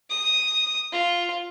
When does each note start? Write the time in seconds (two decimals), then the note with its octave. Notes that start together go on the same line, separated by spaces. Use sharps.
0.10 D#6
0.93 F4